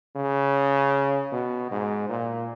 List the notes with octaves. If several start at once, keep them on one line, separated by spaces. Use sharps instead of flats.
C#3
B2
G#2
A#2